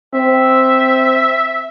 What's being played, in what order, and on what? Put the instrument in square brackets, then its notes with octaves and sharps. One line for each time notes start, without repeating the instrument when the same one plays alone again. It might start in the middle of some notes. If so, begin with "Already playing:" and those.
[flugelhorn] C4 [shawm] E5